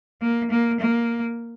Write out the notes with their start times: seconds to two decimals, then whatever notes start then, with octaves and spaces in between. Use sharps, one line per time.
0.22 A#3
0.51 A#3
0.80 A#3